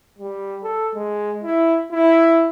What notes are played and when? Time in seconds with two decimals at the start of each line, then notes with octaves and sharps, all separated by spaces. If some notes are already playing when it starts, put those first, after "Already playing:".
0.19 G3
0.63 A4
0.95 G#3
1.43 E4
1.92 E4